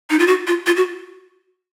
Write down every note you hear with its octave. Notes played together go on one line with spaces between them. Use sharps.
D#4
F4
F#4
F4
F4
F#4